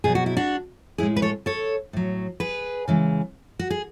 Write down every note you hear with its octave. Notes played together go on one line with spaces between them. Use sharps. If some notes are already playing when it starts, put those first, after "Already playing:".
B2 F#3 G#4
F#4
E4
D4 F#4
A2 G#3 E4 G#4
B4
A4 C#5
A4 C#5
A2 F#3
G#4 B4
C#3 E3 G#3
F#4
G#4